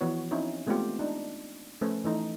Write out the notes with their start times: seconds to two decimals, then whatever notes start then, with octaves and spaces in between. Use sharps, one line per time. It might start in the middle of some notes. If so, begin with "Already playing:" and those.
0.01 E3 F3 B3 F#4 C#5
0.31 C4 C#4 D#4 E4 F#4 C#5
0.67 G#3 A3 B3 C4 F4 G4
0.99 D4 D#4
1.81 F3 A3 C#4 B4 C5
2.04 E3 A3 D#4